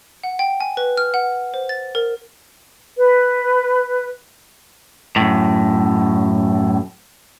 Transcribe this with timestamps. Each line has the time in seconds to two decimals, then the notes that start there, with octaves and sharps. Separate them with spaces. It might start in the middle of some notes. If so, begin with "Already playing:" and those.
0.24 F#5
0.39 G5
0.60 G#5
0.77 B4
0.97 F6
1.14 F#5
1.54 C5
1.69 A6
1.95 A#4
2.96 B4
5.16 F#2 A2